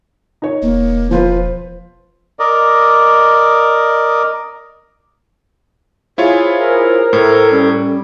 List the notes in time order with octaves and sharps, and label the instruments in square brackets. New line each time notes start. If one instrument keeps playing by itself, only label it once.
[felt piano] D#4 C#5
[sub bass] E1 [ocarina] A#3
[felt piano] F3 F4 B4 [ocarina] C5
[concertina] A#4 D5 D#5
[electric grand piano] E4 F4 C#5 [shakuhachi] G#4 [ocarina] C5
[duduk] A#4
[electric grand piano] A2 [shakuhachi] A4
[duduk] G3 [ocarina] C#4